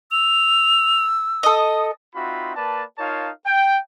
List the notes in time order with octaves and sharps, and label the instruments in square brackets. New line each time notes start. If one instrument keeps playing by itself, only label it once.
[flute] E6 [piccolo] F7
[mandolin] A4 D#5 [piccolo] D#6
[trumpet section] C4 D#4 F4 F#4 E5 B5
A#3 B4 D5 A5
D#4 F4 A#4 C#5 F5 A5
G5